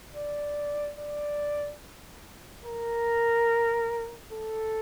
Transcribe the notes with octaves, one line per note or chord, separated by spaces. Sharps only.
D5
D5
A#4
A4